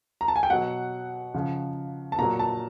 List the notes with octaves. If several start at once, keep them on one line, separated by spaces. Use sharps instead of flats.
A#5
A5
G#5
G5
B2 F#3 F#5
C#3 F3
A5
A#2 F#3 A#5
A5